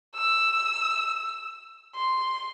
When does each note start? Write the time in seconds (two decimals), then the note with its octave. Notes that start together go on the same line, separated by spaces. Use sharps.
0.15 E6
1.95 C6